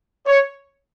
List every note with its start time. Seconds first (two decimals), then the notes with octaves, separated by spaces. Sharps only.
0.27 C#5